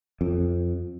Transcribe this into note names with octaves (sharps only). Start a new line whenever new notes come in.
F2